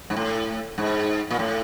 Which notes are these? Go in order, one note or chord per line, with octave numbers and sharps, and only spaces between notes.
G#2
A2
G#2
A#2
A2